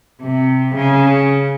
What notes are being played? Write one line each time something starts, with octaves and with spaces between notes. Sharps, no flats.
C3
C#3